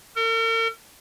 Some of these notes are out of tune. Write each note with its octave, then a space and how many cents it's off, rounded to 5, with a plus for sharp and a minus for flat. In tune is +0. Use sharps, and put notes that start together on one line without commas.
A#4 -45